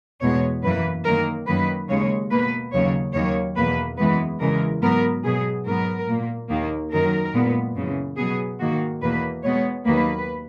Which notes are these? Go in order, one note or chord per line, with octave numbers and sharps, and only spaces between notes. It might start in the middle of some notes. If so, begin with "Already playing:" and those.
E2 B2 G#3 B3 C#5
F#2 E3 A#3 B4
F#2 D#3 A#3 A#4
F#2 D#3 F#3 A#3 B4
D#2 C#3 G#3 C#5
B2 A#3 B4
D#2 C#3 F#3 C#5
D#2 D#3 F#3 A#3 C#5
E2 B2 A#3 B4
F#2 E3 G#3 B3 B4
E2 C#3 E3 G#3 A#4
G#2 F#3 B3 A#4
B2 F#3 B3 G#4
G#2 F#3 B3 A#4
A#2 A#3
D#2 D#3 A#3
F#2 D#3 F#3 A#4
A#2 G#3 B3
F#2 C#3 E3
B2 F#3 B3 G#4
G#2 D#3 A#3 F#4
E2 B2 A#3 B4
B2 G#3 B3 C#5
D#2 D#3 F#3 A#3 B4